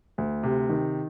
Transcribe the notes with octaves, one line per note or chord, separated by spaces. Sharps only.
D2
C3
D#3